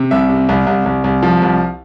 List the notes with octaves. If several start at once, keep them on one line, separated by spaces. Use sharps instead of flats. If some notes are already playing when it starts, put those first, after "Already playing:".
Already playing: C3
C2 E5
C3
C2
C2
C2
C2
F3
C2